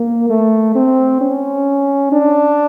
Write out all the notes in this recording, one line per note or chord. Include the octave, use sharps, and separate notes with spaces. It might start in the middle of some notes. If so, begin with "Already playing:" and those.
Already playing: A#3
A3
C4
C#4
D4